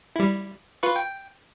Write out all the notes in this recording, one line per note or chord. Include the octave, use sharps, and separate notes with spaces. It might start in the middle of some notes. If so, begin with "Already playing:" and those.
G3 E4
F4 B4 C#6
G5